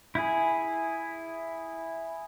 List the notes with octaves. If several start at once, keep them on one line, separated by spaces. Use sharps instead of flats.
E4 G#4